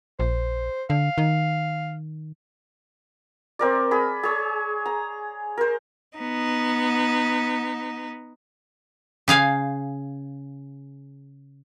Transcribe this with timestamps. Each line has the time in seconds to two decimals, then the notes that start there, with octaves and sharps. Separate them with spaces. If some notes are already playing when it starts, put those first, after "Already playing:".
0.19 A#1 C5
0.90 D3 F5
1.18 D#3
3.59 C4 A#4 D5
3.91 G#4 B5
4.23 G#4 C#5
4.86 A#5
5.57 A#4 C5
6.19 B3 D#4
9.28 C#3 G#4 F5 G#5